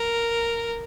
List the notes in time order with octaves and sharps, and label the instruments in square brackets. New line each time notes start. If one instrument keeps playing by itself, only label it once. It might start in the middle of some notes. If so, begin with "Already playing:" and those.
Already playing: [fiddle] A#4